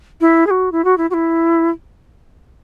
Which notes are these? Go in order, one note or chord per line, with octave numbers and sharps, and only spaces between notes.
E4
G#4
F#4
E4
F#4
E4
F#4
E4